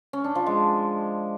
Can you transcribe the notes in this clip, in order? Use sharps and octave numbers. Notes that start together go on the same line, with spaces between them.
C#4
D4
F3
G#3